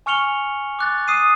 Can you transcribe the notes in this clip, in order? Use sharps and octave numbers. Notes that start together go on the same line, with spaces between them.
G#5 C#6 F6 C#7 F7 G7
D6 F#6 A6
D#6 C7 D#7